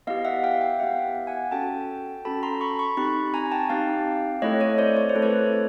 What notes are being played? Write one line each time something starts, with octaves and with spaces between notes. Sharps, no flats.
B3 E4 G4 D#5 F5
E5 F#5
F5 G5
F5 G5
B3 E4 G4 E5 F#5
F#5 G#5
C#4 F#4 A4 G5 A5
C#4 F#4 A4 A5 B5
A#5 C6
B5 C#6
B5 C#6
C4 D#4 G4 B5 C#6
G#5 A#5
G5 A5
C4 D#4 G4 F5 G5
A3 C4 E4 A4 C#5 D#5
C#5 D#5
C5 D5
C#5
C5
A3 C4 E4 A4
B4 C#5